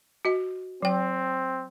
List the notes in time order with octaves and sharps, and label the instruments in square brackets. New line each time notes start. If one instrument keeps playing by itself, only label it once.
[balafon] F#4 D#5
[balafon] F#3 G5 [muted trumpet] C4